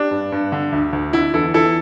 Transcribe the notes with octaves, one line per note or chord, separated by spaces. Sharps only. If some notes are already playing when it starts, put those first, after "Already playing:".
Already playing: D4 G4
G2
G2
D3
D2
D2
D3 E4
E2 E4 A4
E2 E4 A4